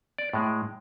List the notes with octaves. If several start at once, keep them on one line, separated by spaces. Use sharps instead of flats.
D5
A2 G#3